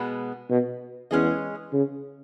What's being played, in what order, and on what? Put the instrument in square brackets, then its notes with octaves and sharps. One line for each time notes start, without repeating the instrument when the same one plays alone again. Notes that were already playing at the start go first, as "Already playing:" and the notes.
Already playing: [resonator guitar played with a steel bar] B2 G#3 B3
[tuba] B2
[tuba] E2 [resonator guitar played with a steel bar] G#3 C#4 G#4 D#5
[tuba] C#3